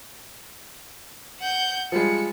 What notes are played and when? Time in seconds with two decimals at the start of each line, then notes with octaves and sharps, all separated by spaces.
1.39 F#5 G6
1.92 F3 G3 G#3 C#7